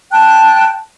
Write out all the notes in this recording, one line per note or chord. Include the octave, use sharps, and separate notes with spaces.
G5 A5 F#6